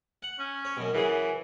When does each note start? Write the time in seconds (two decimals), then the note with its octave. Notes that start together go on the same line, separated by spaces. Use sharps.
0.23 F#5
0.39 C#4
0.65 C#5
0.77 F#2 B2
0.94 F#2 C#3 E3 G#4